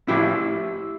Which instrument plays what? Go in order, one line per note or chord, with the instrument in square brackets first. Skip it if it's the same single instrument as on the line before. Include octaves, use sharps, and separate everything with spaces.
[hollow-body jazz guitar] A2 F3 E4 G4